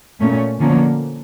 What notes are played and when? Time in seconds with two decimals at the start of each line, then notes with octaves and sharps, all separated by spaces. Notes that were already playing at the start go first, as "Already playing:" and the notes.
0.19 A#2 A3 C#4
0.60 D3 F3 A#3 C#4